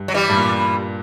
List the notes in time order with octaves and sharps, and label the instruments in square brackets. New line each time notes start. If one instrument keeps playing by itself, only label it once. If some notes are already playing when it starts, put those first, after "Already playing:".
Already playing: [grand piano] G2
[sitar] F#3
E3 G3
[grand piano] G2
A#2